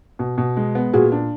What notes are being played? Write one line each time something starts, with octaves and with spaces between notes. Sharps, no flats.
B2
B2
G#3
B3
A#2 F#4 G#4
D4